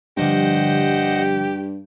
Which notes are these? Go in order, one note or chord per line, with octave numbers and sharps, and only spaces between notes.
G2 D3 F3 G3 G4 C5 D#5 F#5